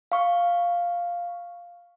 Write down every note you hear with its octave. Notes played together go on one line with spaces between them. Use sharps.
F5 C#6